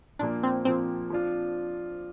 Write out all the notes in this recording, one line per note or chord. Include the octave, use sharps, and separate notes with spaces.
A#2 F3 A#3 D4
C4
A#2 F3 A#3 C4
F3 D4 F4